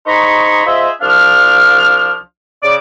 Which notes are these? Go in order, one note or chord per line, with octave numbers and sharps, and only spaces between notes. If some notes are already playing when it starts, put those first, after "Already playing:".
D#4 G#4 C5 A#5 B5 C#6
F4 G#4 C5 D#5 E5
C2 F3 D4 F5 F6
C#3 D5 D6